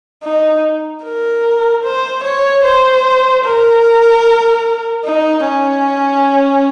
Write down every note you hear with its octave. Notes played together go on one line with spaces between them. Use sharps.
D#4
A#4
C5
C#5
C5
A#4
D#4
C#4